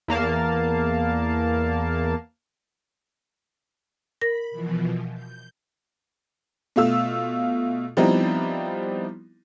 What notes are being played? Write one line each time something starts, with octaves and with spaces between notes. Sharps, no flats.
E2 A#3 F5 A5
A#4 B5 A#6
B2 E3 F3
G6
B2 A3 F4 E6
F3 G3 B3 C4 D#4 E4